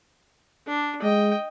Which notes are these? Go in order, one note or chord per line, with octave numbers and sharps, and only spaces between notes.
D4
G#3 D#5 G5